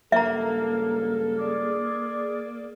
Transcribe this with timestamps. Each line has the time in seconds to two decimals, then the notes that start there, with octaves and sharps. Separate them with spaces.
0.12 C#2 G2 A#3 A4 E5 A#5
1.38 G#4 D5